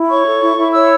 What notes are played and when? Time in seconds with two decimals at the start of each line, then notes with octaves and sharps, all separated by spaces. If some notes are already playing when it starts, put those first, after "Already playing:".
Already playing: E4
0.09 C#5 C#6
0.26 A4
0.42 E4
0.58 E4
0.74 C#5 E6